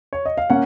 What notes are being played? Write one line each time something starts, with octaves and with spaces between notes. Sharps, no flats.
C#5
D#5
F5
A#3 C#4 F#5